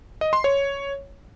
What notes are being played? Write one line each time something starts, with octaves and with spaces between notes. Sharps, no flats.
D#5
C6
C#5